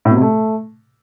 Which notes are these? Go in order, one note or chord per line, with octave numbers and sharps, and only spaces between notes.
A2
B2
C3
A3